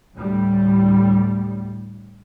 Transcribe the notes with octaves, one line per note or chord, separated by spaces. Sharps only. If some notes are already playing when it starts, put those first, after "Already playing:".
D2 A2 G3